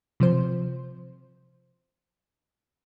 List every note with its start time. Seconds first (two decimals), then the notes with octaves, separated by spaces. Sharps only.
0.20 C3 F3 C5